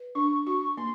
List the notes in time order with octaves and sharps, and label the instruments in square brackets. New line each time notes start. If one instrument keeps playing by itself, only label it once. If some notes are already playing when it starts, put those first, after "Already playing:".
Already playing: [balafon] B4
[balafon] D4 [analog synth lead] C#6
[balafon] F#4 [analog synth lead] C#6
[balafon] A#3 [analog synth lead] C6